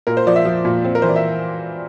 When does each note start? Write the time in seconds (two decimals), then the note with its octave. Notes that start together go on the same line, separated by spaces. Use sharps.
0.07 A#2 A#4
0.17 C5
0.27 F3 D5
0.36 E5
0.45 F3
0.65 A#2
0.84 C4
0.95 A#4
1.02 E3 C5
1.09 D5
1.16 E5